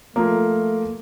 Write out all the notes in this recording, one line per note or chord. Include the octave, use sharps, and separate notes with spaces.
F3 A3 A#3